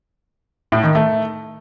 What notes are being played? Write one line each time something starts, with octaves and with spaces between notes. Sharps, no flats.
A2
D#3
A3